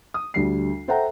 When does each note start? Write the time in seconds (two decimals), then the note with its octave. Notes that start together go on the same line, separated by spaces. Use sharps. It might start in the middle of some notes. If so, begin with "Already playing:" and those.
0.14 D#6
0.34 D2 G3 C7
0.88 A4 C5 E5 F#5 G5 A#5